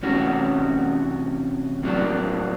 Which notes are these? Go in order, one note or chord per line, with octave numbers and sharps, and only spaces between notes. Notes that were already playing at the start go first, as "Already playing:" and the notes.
C3 E3 A3 C#4 F#4
A2 F#3 A#3 D4